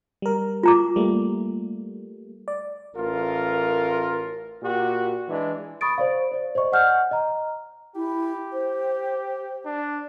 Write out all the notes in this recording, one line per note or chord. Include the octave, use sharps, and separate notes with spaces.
G3 A#4
F4 A#5 D6
G3 A3 A#3
D5
A1 F4 A#4
A#2 F#4 G4
E3 G#3 D4
B5 C#6 D#6 A6 D7
C5 D5 F5
C5 D5
C5 D5 D#5 C#6
D#5 F#5 G#5 F6 G6
D#5 A#5
E4 G4
C5
D4